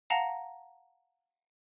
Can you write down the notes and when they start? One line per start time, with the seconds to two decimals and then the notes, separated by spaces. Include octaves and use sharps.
0.10 F5 F#5 A5 A#5 A#6